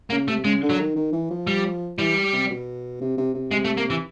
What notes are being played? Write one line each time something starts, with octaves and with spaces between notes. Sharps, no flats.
C#3 A#3
C3 A3
C#3 G#3
D3
F#3
D#3
D#3
E3
F3
G3
E3 G3
C3
B2
C3
C3
C3
C3 G#3
A3
A#3
E3